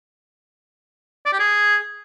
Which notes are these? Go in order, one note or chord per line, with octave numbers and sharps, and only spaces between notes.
D5
G4
G#4